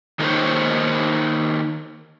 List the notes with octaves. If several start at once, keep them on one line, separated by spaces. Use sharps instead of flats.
D#3 A#3 D#4 C5 C#5